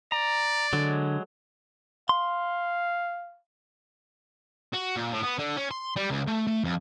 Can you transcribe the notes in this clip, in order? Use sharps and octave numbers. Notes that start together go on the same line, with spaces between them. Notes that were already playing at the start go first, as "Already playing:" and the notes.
D5 A#5
D3 F#3 G#3
F5 C6
F#4
A#2
A2
B3
D3
C#4
C6
G3
C#2
A3
A3
F2